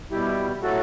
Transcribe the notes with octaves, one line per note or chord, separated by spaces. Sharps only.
B2 G3 E4 G4
A2 F#3 A3 F#4 A4